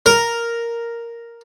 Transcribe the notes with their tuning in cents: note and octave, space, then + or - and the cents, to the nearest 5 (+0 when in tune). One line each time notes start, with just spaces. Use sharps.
A#4 +0